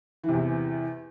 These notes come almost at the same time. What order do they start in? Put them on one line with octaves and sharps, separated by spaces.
E3 C3 E2